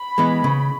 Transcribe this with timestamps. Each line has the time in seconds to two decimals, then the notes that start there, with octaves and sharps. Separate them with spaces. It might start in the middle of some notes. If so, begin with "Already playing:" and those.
Already playing: B5
0.18 E3 G#3 B3
0.44 C#3